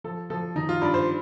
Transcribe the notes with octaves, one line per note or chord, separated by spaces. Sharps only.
F3 A4
F3 A4
D#3 D#4
F4
G2 D5
C5